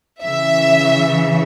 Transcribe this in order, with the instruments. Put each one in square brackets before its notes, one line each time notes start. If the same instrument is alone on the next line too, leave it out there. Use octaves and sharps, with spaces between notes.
[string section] C#3 E3 E5